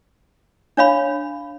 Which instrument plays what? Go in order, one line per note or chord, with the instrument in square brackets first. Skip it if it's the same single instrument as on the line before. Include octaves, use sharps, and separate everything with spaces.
[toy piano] D4 C#5 F5 B5